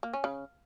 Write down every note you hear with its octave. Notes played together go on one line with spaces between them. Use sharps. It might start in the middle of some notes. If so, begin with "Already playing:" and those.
A#3
C#4
C#3